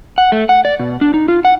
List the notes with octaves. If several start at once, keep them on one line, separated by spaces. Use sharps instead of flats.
F#5
A3
F#5
D5
B2
D4
D#4
F4
F#5